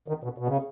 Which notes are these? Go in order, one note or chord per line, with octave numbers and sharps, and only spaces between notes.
D#3
B2
B2
C#3